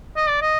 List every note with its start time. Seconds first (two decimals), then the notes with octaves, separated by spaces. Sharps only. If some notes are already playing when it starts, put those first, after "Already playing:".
0.16 D#5
0.29 D5
0.42 D#5